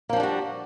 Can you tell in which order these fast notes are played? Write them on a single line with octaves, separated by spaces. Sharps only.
A#3 F3 D4 G3 F#4